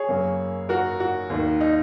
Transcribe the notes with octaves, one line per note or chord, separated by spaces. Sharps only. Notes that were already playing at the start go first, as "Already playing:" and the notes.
Already playing: G#4 C#5
F#2 C#3 A#3
F#4 A#4
F#4
D#2 D#3 A#3
D#4